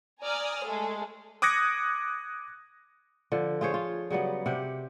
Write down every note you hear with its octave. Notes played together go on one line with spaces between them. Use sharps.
D5 G#5 A#5 D#6 F6
G#3 A3 G#4 A4
D6 D#6 F#6 G#6 A#6 C#7
D3 F3
F4 G#4 C5 C#5
F4
C#3 F#3 G3 B3
C3 G4 F#5